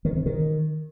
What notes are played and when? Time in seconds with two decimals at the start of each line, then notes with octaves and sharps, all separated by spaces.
0.05 D#3
0.15 C3
0.26 D#3